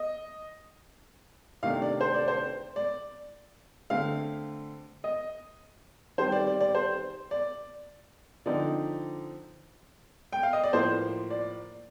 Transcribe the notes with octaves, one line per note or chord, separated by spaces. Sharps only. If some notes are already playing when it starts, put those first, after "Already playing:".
Already playing: D#5
C3 D#3 A3 D4 F5
D5
C5
D5
C5
D5
D3 A3 C4 F5
D#5
D#3 G3 C4 C5
D5
D5
D5
C5
D5
D3 F3 C4 D#4 D5
G5
F5
D#5
D5
A2 F3 A#3 C5
D5